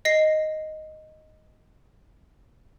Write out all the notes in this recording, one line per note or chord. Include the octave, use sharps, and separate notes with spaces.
D#5 A#6 C7